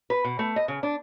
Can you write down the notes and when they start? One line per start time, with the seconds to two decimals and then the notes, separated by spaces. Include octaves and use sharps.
0.10 B4
0.24 B2
0.39 A3
0.56 D#5
0.68 C#3
0.83 D4